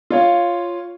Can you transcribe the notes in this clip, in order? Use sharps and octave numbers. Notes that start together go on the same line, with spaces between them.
F4 C#5 F5